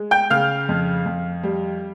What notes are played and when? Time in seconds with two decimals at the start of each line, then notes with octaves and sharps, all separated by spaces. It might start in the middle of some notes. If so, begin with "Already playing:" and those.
Already playing: G#3
0.11 G5 G6
0.30 C#3 F5 F6
0.69 F2
1.06 F2
1.44 G3